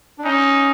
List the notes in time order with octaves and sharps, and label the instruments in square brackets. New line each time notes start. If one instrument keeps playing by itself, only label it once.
[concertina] D4
[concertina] C#4 [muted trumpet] D#4